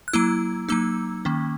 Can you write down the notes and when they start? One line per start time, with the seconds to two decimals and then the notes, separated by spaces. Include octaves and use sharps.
0.08 F#6
0.13 F#3 A#3 E4 E6
0.69 F#3 A#3 D#4 E6
1.25 D#3 A#3 C#4